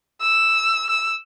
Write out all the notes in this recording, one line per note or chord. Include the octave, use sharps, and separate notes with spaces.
E6
E6